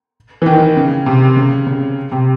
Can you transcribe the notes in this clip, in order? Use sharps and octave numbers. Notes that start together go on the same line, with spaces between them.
E3
D#3
C#3
C3
C#3
C#3
C3